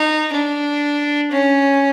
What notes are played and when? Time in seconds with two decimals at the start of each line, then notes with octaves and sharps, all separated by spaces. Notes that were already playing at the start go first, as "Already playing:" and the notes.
Already playing: D#4
0.32 D4
1.31 C#4